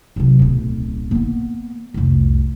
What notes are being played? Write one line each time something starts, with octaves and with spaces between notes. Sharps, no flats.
C3 F#3
D1 B1
A#3 B3
F1 C2